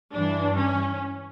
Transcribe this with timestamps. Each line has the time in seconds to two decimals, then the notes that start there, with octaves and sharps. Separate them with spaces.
0.13 G2 E3 D4
0.57 C#4